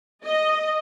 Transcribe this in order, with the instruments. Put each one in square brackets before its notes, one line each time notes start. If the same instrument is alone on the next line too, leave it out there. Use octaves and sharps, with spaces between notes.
[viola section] D#5